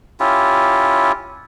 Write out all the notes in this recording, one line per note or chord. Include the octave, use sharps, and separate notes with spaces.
C#4 E4 F4 G4